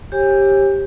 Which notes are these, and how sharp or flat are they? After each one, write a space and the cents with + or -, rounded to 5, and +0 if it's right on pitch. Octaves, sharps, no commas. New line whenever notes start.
G4 +5 C#5 -40 G#5 -35